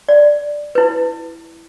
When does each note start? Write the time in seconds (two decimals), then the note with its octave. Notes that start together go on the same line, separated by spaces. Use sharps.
0.09 D5
0.75 E4 B4